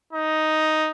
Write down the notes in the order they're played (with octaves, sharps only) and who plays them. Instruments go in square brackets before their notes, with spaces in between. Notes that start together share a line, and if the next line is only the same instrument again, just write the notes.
[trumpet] D#4